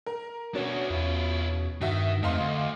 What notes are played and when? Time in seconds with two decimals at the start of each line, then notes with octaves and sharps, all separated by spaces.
0.06 A#4
0.55 B2 C#4 D4 F#4
0.90 E2 E4 F4
1.82 G2 D#3 F#4 E5
2.23 F2 A3 C4 D#5 F5 C6
2.40 D2 D3